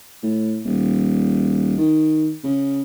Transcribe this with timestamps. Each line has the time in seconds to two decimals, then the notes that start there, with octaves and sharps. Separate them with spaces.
0.23 A2
0.65 D#1
1.78 D#3
2.44 C#3